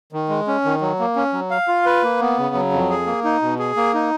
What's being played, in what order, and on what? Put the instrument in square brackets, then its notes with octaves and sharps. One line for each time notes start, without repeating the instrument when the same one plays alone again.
[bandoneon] D#3
G#3
C#4
D#3
F#3
A#3
C#4
F#3
F5
F4
B4
A#3
B3
C#3
F#3
F2
G#4
A#3
D#4
B2
G#4
A#3
D#4